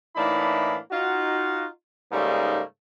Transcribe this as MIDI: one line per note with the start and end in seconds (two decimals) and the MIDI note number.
0.16 0.77 45
0.16 0.77 52
0.16 0.77 58
0.16 0.77 62
0.16 0.77 63
0.16 0.77 83
0.92 1.66 63
0.92 1.66 65
0.92 1.66 66
2.12 2.61 44
2.12 2.61 49
2.12 2.61 55
2.12 2.61 57
2.12 2.61 58
2.12 2.61 63